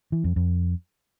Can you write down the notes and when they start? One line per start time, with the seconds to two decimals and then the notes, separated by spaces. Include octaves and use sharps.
0.12 E3
0.24 F2
0.36 F2